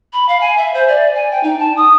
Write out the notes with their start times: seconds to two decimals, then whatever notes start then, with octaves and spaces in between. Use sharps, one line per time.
0.13 B5
0.28 F5
0.41 G#5
0.57 E5
0.74 C5
0.88 D5
1.15 G#5
1.31 G5
1.43 D#4
1.59 A5
1.77 D#6